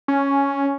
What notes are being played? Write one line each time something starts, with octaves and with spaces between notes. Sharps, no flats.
C#4